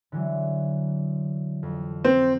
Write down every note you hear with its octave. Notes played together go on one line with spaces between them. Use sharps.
D3 E3 F#3
F2
C4